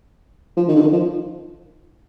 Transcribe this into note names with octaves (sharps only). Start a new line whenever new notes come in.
F3
D#3
D3
D#3
F3